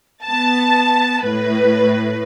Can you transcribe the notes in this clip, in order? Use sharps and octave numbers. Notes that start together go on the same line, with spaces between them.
B3 A5
A2 B4